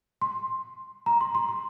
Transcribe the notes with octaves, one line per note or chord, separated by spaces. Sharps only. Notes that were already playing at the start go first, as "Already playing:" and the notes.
C6
A#5
C6
C6
C6